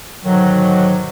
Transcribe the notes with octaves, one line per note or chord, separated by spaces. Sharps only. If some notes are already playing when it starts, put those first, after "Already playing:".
G#2 B2 D3 D#3 F#3